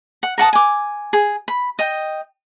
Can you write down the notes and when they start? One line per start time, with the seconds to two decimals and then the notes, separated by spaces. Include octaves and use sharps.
0.23 F#5
0.38 A#4 F#5 A5 D#6
0.53 G#5 D6
1.13 G#4
1.48 B5
1.79 D#5 G5